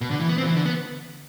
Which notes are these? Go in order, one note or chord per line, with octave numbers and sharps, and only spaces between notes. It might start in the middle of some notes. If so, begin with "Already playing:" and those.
B2
D3
E3
B3
C4
F3
E3
D3
B3